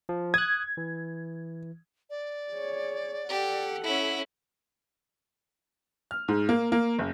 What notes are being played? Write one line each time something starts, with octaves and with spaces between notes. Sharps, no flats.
F3
D#6 F#6 G#6
E3
D5
G#4 C#5
G4 A4 F#5
C#4 E4
F6
G#2
A#3
A#3
F#1